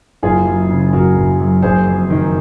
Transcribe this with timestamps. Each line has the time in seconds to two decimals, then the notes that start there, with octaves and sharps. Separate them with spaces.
0.23 F#1 F4 G#4
0.45 F#2
0.70 C#3
0.93 F#1 F#4 A#4
1.16 F#1
1.39 F#2
1.62 F#1 G#4 C5
1.86 F2
2.10 D#3